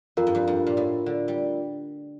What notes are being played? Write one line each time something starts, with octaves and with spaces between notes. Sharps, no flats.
F2 F4 A#4 F5
G2
F2
G2
A#2
A2
D3
G3